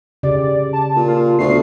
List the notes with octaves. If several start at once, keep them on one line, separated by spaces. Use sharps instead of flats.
C#3 G4 D5
A5
A#2
F4
D2 B3 C7